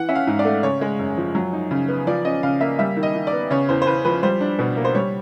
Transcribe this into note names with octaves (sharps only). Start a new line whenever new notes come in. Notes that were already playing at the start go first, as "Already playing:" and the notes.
Already playing: E3 F#5
C#4 E5
F5
G#2
D5
A3
C#3 C#5
G#3
F#2
F3
F#3
D#4
C#3
B3
F3 D5
C#4 D#5
C#3 F5
A#3 E5
G3 E5
D#3
D#5
D#3
D5
B3
C#3 C#5
E2 C5
C5
E2 B4
F3 B4
G3 C5
D4
B2
A#3
C5
G3 C#5